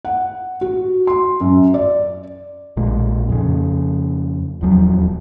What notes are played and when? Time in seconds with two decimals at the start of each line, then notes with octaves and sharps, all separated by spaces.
0.05 F#5
0.61 F#4
1.07 C6
1.41 F#2
1.74 D5
2.77 A#1 A#2 G#3 A#3
3.29 F2 C#3
4.61 D#1 E2 F3 F#3